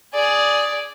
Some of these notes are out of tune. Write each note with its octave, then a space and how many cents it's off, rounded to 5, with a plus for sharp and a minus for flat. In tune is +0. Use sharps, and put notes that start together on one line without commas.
G#4 +0 D5 +0